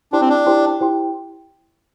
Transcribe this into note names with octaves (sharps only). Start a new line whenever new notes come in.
D4 E4 G4 C5 G5 C6
C4
D4
E4 G4 C5 G5 C6
E4 G4 C5 G5 C6